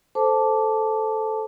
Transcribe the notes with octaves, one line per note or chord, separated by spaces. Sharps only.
A4 C5 A5 D6